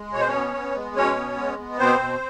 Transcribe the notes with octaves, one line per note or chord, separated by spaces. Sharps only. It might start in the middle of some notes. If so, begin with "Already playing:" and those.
Already playing: G#3
B2 C#5
C5
C#4 C#5
B3
B3
G#3
B2 C#4 C#5
B3
G#3
B3
B2 C4 C5
B2